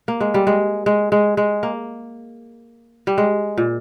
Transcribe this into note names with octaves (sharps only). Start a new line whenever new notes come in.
A#3
G#3
G3
G#3
G#3
G#3
G#3
A#3
G3
G#3
A#2